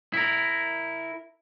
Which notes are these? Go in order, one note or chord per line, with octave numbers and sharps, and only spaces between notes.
E4 A#4